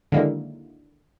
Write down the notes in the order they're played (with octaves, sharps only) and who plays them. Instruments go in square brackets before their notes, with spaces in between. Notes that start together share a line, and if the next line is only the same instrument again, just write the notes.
[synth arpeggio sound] D3 D#3 F#3 G#3 A#3 E4